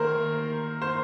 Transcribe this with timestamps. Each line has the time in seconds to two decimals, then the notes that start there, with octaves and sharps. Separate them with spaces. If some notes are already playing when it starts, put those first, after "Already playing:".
Already playing: D#3 A#3 A#4 C5
0.82 C5